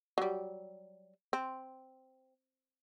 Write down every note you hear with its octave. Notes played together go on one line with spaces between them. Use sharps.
F#3 G3
C4